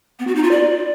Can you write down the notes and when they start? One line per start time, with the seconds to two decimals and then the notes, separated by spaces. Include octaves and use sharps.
0.19 B3
0.27 F#4
0.35 D#4
0.43 F4
0.51 D5